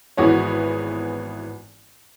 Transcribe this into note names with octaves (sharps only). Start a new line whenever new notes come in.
G#1 E3 B3 F#4 G#4 C#5